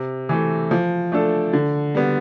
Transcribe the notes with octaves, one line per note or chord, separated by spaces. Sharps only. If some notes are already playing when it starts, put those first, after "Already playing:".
Already playing: C3
E3 A3
F3
A3 D4 A4
D3
G3 B3